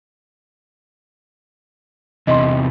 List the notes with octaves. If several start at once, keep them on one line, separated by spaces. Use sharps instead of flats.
E2 C3 E3 D#5 C6